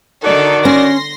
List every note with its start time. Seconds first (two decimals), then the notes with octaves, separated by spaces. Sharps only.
0.24 D3 D#3 D#4 F#4 A4 D5
0.65 C#4 C6 A#6